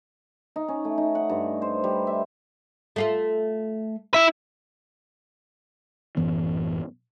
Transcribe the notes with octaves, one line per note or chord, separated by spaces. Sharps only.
D#4
C#4
A3
D#4
F#5
G2
C5
G3
E5
A3 F4 A4
E4 E5
A1 F#2 E3 B3